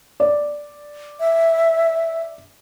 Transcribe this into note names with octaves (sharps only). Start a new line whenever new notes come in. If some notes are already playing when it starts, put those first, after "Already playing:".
D5
E5